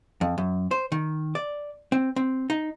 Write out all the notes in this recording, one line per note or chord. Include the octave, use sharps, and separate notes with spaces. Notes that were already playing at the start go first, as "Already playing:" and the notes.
F2
F#2
C5
D#3
D5
C4
C4
D#4